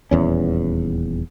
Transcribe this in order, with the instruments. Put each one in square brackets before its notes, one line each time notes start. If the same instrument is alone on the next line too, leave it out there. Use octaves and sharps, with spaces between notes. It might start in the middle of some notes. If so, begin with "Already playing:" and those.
[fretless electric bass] D#1 E2 C#4